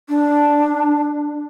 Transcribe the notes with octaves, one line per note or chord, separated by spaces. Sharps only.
D4